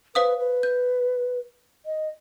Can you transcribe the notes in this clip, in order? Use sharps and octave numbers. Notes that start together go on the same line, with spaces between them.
B4 C5 F5 D#6
B4
G6
D#5